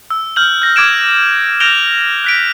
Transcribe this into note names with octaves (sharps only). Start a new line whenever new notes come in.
E6
F6 G6 F#7
G6 A#6
D6 G#6 D7 E7
F6 G6 A#6 D7 F7 G7
F#6 B6 D7